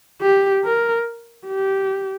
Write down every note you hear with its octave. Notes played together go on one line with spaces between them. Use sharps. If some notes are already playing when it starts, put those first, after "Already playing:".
G4
A#4
G4